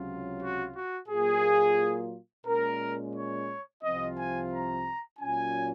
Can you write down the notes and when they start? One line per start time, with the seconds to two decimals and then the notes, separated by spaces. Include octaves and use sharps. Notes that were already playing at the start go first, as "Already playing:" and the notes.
Already playing: C#2 C3 F#3 C#4 F4
0.40 F#4
0.73 F#4
1.08 A#2 F#3 A#3 F4 G#4
2.45 A#2 G#3 C#4 A#4
3.14 C#5
3.82 C2 C3 F3 C4 F4 D#5
4.16 G#5
4.51 A#5
5.19 A#2 F#3 C#4 F4 G#5